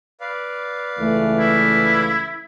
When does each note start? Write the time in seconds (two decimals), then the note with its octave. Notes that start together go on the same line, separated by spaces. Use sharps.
0.21 B4 D5 F5
0.99 C#2 E3 A3
1.39 E4